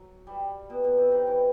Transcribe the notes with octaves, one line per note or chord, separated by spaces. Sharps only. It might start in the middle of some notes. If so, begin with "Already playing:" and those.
Already playing: F#3
G3
B2
B2
C3
D#3
E3